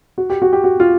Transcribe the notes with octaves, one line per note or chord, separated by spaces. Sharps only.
F#4
G4
F#4
G4
F#4
F4